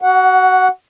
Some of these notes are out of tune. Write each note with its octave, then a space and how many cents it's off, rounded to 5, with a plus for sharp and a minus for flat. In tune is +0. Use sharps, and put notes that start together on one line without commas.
F#4 +25 F#5 +0